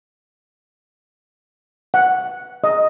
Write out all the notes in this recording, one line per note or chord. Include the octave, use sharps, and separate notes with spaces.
F#5
D#5